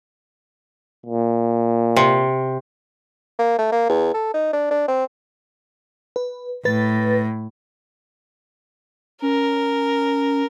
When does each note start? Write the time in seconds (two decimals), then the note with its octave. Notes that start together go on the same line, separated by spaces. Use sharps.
1.06 A#2
1.96 C3
3.39 A#3
3.58 A3
3.72 A#3
3.89 E2
4.14 A4
4.34 D#4
4.53 D4
4.71 D4
4.88 C4
6.16 B4
6.65 A2 B4 A6
9.22 C#4 A#4